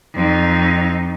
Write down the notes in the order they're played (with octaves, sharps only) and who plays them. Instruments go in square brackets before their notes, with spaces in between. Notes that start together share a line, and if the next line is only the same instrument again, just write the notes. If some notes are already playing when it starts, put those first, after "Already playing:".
[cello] F2 D#4